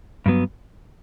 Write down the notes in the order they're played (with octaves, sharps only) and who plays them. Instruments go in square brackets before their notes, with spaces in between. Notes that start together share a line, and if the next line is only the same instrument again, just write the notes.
[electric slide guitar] G2 F#3 B3